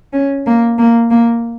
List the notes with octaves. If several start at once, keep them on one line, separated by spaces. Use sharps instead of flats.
C#4
A#3
A#3
A#3